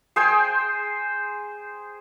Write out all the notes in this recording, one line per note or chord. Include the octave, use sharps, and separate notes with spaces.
G#4 C5 G5